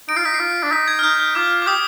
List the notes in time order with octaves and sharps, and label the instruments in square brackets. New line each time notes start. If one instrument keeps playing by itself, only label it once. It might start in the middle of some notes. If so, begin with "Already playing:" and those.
[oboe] D#4 [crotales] D7
[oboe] F4 [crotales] C7
[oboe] D#4 [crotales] B6
[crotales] C7
[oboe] F4
D4
[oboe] D#4 [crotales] B6
[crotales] G#6
F6
[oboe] D#4 [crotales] G6
[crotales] F6
[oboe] F4 [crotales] D6
[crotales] D6
[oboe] G4 [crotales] D#6